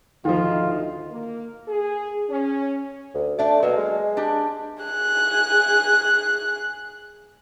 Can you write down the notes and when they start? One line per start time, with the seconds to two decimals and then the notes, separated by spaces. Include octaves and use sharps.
0.25 D2 D#3 F3 D#4 F4
1.10 A#3
1.68 G#4
2.30 C#4
3.14 D2
3.39 A3 D4 D5
3.63 B2 F#3 A#3
3.77 G#3
4.17 D4 G4
4.83 G#4 F#6